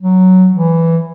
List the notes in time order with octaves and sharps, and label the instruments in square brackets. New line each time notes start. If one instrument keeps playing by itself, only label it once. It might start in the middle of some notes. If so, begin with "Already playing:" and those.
[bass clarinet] F#3
E3